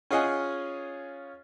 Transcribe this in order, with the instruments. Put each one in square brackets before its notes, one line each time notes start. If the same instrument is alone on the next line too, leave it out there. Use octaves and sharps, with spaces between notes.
[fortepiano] C#4 F4 G#4 D#5 F#5 G#5